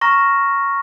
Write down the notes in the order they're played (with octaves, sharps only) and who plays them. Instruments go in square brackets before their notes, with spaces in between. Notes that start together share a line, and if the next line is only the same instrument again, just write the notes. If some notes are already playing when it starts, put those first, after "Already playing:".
[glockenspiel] A#5 C#6 F6 A#6